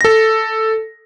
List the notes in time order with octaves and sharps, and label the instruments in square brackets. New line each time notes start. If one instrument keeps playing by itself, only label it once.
[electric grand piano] A4 A#6